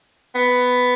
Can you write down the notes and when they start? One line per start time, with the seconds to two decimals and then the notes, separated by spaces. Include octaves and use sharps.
0.35 B3